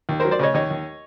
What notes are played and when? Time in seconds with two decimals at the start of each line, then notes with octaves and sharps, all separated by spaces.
0.09 D#2
0.20 F#3 A#4 C5
0.31 C5 D5
0.39 C#3 C#5 D#5
0.54 D#2 C#5 D#5
0.71 D#2